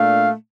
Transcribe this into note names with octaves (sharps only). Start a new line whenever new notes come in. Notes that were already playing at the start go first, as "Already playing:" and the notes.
Already playing: A#2 A3 D4 F5